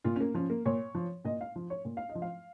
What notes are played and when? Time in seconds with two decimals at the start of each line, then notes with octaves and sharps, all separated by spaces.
0.04 A#2 F4
0.16 C#4
0.20 A#3
0.34 F3 C#4
0.50 A#3
0.66 A#2 C#5
0.95 F3
1.25 A#2 D#5
1.41 F5
1.56 F3
1.70 C#5
1.85 A#2
1.97 F5
2.09 D#5
2.15 F3
2.22 F5